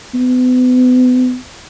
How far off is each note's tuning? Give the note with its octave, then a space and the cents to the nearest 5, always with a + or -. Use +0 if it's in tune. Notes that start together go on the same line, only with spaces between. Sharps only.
B3 +35